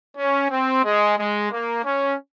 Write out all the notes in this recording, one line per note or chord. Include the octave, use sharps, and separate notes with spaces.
C#4
C4
G#3
G#3
A#3
C#4